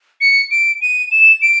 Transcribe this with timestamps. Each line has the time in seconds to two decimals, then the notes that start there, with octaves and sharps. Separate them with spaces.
0.21 C#7
0.51 D7
0.82 D#7
1.12 E7
1.42 D7